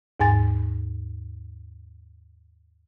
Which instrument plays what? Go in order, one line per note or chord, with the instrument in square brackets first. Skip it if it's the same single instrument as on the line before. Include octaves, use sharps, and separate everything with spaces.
[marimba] D#2 G#2 G#5 A6